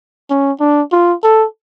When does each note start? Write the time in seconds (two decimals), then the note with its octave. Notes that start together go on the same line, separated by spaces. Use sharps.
0.30 C#4
0.60 D4
0.92 F4
1.23 A4